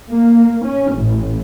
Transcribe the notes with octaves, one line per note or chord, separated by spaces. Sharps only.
A#3
C#4
A1